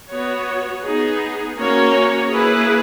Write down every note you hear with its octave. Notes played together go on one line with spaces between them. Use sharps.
B3 F#4 C#5
B3 D#4 G#4
A#3 C#4 F#4 A#4 C#5
A#3 E4 G#4 B4